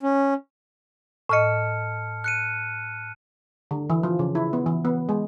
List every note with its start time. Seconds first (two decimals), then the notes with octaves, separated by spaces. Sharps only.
0.03 C#4
1.29 A2 D#5 A5 F6 C#7
2.24 F#6 C#7 D#7
3.71 D3
3.90 E3
4.03 F3
4.19 C#3
4.35 E4
4.53 B3
4.66 E3
4.85 B3
5.09 G#3